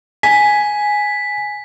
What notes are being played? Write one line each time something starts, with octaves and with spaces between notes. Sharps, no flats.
G#5 B6